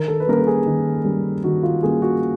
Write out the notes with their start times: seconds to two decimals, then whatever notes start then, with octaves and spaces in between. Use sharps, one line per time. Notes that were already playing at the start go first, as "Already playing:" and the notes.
Already playing: D#3 A#4
0.08 A4
0.20 B4
0.27 G3 A#3 C#4 A#4
0.38 A4
0.47 G#4
0.66 D#3
1.05 G3 A#3 C#4
1.44 D#3 F#4
1.63 F4
1.83 G3 A#3 C#4 G#4
2.02 F#4